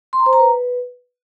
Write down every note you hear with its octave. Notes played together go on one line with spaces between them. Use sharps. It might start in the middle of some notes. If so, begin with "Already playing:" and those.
C6
A#5
C5
A#5
B4